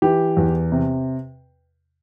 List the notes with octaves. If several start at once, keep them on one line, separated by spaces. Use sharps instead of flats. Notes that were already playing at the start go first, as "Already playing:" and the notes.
E3 G4
E2
C3